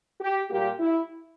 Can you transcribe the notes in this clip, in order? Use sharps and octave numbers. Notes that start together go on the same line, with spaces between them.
G4
A#2 G3 A#3 G4
E4